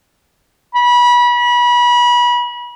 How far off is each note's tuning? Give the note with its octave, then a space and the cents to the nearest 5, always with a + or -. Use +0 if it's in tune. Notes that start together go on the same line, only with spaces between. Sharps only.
B5 -30